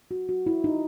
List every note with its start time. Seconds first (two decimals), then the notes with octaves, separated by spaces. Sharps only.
0.11 F#4
0.29 F#4
0.46 E4
0.64 D#4